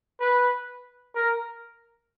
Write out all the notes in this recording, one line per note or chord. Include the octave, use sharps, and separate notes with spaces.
B4
A#4